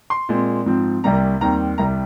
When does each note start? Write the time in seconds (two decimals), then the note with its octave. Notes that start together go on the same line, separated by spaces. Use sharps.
0.10 C6
0.29 A#2 G#3 C4
0.66 G#2 F3 C4
1.04 C2 C3 G3 A#3 A#5
1.41 D#2 D#3 G3 C4 A#5
1.78 C2 C3 G3 A#5